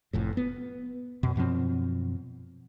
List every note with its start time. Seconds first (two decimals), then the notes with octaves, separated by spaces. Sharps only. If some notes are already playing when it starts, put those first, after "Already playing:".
0.13 F1 F2 A2
0.37 B3
1.23 F#2 B2
1.36 F#2 B2 F3 C4